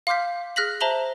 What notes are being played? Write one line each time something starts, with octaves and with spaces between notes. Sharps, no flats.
F5 C6 D6 F6 G6 B6
G#4 F6 F#6 A#6 B6 F#7
C5 E5 A5 A#5 F#7 G7